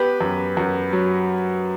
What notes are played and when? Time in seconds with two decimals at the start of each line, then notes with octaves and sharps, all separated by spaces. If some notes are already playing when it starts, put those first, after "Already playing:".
Already playing: B3 G4 B4
0.21 F#2
0.57 F#2
0.93 F#3